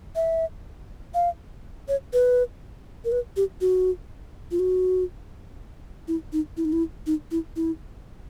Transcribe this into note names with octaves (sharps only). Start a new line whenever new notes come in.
E5
F5
C#5
B4
A#4
B4
G4
F#4
F4
F#4
E4
D#4
E4
D#4
E4
D#4
E4
E4